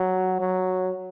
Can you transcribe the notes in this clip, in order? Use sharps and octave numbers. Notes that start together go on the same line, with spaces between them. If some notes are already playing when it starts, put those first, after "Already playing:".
Already playing: F#3
F#3